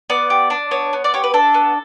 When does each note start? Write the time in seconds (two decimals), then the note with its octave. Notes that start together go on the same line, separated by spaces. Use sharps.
0.10 B3 D5
0.30 G4
0.50 D4
0.71 B3 C#5
0.93 B3
1.04 D5
1.14 G4 C#5
1.24 B4
1.34 D4 A4
1.54 B3